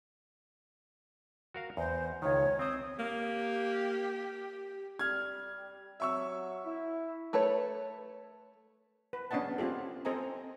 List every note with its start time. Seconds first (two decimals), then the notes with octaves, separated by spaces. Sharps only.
1.54 F#4 A#4 F5
1.77 E2 C5
2.22 C#2 D#3 C#5
2.59 C4 C5 D#6
2.99 A#3 G4
4.99 G3 F6 G#6
6.00 F#3 E5 C#6 E6
6.65 E4
7.33 A3 A4 B4 C#5
9.13 B4
9.31 B3 C#4 D4 D#5 F#5 A5
9.58 C4 C#4 F4 G4 A4
10.05 C4 A4 C5 D#5 G#5 A#5